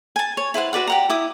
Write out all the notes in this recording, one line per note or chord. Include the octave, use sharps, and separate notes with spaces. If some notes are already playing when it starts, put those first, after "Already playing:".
G#5 A5
C#5
E4 B4 C5 F#5
F#4 B4 D5 F#5
G4 F#5 A#5
E4 D6 D#6